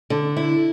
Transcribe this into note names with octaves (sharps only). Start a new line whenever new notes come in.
D3
E4